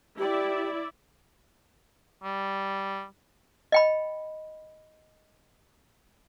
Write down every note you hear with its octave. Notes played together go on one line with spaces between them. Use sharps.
E4 G4 D5 E5
G3
D#5 G5 B5